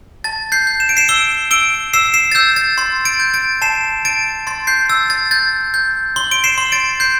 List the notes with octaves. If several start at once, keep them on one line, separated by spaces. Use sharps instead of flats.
A5 A6
G6 C7
G6
E7
D7
C7 E7
E6 D7 G7
E6 D7 G7
E6 C7 E7
C7 E7
A6
E6 G6
A6
C6 A6
A6 D7
G6
A6 D7
A5 C7 E7
A5 A6 D7
C6 A6
G6 C7
E6 A6
A6
G6 A6
G6
C6 G7
D7 G7
C7 E7
C6
A6 D7
G6 C7